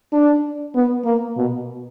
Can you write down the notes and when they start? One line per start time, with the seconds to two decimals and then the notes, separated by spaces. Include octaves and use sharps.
0.13 D4
0.75 B3
1.05 A#3
1.37 B2